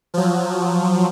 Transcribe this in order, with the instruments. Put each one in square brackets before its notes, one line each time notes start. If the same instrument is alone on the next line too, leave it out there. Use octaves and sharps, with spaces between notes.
[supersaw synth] F3 F#3